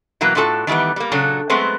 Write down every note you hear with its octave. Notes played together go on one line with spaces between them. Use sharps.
B2 E3 F#3 A#3
A2 D4 F4 F#4 A4 A5
D#3 E3 G3 A3 B3
G3 A#3
A#2 C#3 F#3 D4 F#4 A4
F#3 G#3 A3 B3 C4